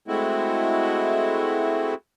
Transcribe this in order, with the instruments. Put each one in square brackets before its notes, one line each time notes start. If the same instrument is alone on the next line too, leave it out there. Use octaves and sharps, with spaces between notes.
[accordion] G#3 A3 C4 E4 F#4